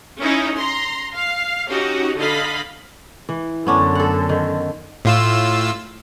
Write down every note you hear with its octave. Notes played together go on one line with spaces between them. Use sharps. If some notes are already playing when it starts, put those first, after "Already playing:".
C#4 D#4 E4
A#5 C6
F5
C#4 D#4 F#4 G4
D3 D#5 F5 B5
E3
F#2 D3 B3 C#4 D4
A4 F#5
D#3
A2 F4 E6